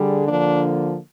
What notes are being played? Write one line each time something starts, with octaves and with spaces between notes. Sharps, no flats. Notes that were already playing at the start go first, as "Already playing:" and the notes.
Already playing: D3 G3 G#4
D3 F3 A#3 D4